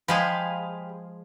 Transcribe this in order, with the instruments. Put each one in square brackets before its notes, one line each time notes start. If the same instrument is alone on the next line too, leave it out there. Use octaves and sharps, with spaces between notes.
[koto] F3 G#3 G#4 [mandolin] G4 F5 B5